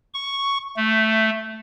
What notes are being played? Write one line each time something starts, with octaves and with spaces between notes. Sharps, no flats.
C#6
A3